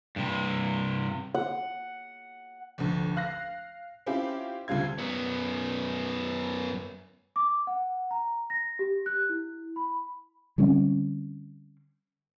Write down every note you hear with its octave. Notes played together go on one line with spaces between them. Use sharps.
G2 C3
F#5
F1 D2
F5 F#6 A#6
C4 C#4 E4 F4 G4
D2 C3 G3 F4 G#6
F#2 B3
D6
F#5
A#5
A#6
G4
F#6
E4
B5
D3 G3 C4 C#4